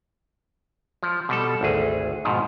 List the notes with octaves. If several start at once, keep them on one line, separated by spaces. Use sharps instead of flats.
F3
B2 G3 A4
G#1 D2 G#4
G#2 B2 D#3 F3